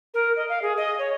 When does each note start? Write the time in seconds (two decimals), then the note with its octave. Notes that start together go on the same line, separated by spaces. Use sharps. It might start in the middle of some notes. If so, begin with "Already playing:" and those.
0.14 A#4
0.36 D#5
0.49 F5
0.62 G#4
0.77 D#5
0.99 C#5